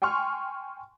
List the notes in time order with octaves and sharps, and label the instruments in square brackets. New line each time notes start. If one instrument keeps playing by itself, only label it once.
[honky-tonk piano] G5 G#5 C6 C#6 F6